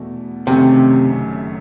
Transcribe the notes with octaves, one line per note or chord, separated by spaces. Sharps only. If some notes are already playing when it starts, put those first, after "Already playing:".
Already playing: E2 B2 A3
F#1 F#2 C3 D#3 A3